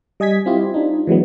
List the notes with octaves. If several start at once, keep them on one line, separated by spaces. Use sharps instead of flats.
G3 D#5 G#5 G#6 B6
C4 E4 F4 G4
D4 D#4
E3 F#3 G#3 B3